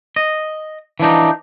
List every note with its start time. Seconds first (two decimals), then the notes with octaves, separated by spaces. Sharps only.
0.16 D#5
1.00 E3 F3 D4 D#4